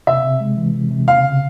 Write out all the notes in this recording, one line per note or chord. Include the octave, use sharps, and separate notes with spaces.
C3 E5
C3
G#3
E3
C3
C3
C#3 F5
C#3